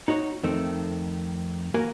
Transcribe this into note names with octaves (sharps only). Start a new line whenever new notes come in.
D#4 F#4 C#5 F#5
F2 D#3 A3 C4
A#3 F#4 A#4 F5 G#5